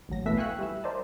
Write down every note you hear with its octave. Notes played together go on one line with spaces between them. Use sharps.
A1 D2 F#3 A#6
B2 E3 A3 B4 E5 B6
F5 G5 G#5 C#6 E6 F#6
G3 E4 E5
A#4 C5 D5 D#5 A5